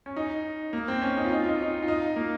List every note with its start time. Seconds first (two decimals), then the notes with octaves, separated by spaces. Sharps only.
0.06 C#4
0.16 D#4
0.73 A#3
0.88 C4
1.02 C#4
1.17 D#4
1.25 F4
1.32 D#4
1.40 F4
1.48 D#4
1.55 F4
1.62 D#4
1.83 F4
1.88 D#4
2.16 A#3